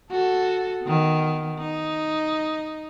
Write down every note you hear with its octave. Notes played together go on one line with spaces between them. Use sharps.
F#4 A4
D#3 B3
D#4